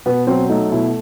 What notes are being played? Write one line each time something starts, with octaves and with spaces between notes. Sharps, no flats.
B2 B3
F#3 C4
A3 D#4
B2 E4